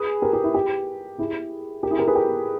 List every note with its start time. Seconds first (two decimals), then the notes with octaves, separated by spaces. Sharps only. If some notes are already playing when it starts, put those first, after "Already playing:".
Already playing: G#4 B4
0.22 G4 A#4
0.33 G4
0.44 E4
0.54 G4
1.18 E4 G#4
1.83 G4 A#4
1.91 E4 G#4
1.99 G4 A#4
2.07 G#4 B4
2.15 G4 A#4